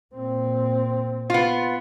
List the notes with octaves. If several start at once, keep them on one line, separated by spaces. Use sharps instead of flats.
A#2 C4
B3 F4